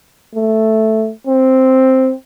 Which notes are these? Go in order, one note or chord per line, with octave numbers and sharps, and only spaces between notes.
A3
C4